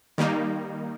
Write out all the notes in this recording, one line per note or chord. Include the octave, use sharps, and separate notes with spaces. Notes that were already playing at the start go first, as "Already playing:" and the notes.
D#3 G3 A#3 D#4